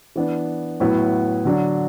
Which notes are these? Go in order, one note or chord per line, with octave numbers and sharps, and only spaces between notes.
E3 B3 D4
A2 F#3 B3 E4
D3 F#3 D4